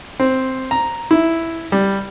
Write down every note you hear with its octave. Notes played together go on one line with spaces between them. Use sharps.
C4
A#5
E4
G3